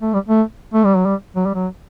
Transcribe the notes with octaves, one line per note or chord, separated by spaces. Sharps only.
A3
G3
A3
A3
G3
F#3
G3
F#3
G3
F#3